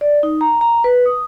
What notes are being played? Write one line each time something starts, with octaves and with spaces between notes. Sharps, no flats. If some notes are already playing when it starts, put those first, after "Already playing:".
D5
D#4
A#5
A#5
B4
D#6